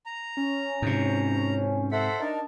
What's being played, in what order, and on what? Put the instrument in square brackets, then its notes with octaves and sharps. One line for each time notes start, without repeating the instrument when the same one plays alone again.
[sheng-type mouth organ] A#5
[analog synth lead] C#4
[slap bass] G#2 C3
[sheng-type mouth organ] A4 C5 F#5 [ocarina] E5 [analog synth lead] B6
[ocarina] D4 [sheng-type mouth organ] D#4 A#4 [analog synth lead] A5